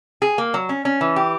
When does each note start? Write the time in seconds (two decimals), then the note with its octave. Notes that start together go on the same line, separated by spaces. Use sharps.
0.22 G#4
0.38 A#3
0.54 F#3
0.69 C#4
0.85 C#4
1.01 E3
1.16 G4